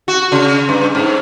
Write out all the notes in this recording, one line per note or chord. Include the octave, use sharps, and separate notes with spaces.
F#4
C#3
G2
G#2